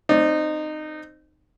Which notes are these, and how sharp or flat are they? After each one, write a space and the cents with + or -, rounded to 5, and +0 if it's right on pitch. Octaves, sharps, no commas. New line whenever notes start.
C4 +0 D#4 -20 D5 +0